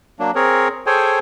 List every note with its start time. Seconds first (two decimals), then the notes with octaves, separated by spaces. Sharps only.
0.20 F#3 A#3 D4
0.35 C4 G#4 A#4 C#5
0.87 G#4 A4 C5 C#5 G5 G#5